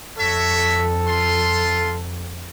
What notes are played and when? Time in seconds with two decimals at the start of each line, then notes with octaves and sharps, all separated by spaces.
0.18 F2 F#4 A4 C#5 E5
1.07 F4 C6